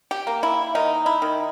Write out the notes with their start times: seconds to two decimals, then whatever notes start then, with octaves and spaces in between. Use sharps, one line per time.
0.11 G4
0.27 A#3
0.43 E4
0.75 D#3 D#4
1.06 E4
1.22 D#3